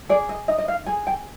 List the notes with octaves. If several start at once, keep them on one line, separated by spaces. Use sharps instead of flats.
G#4 D5
D#5
D#4 D#5
D#5
F5
G#4 G#5
G5